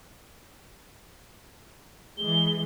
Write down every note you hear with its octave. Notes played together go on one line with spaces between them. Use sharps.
E3 G#3 G7